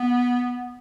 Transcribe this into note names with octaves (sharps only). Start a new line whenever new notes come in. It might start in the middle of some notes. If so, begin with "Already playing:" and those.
Already playing: B3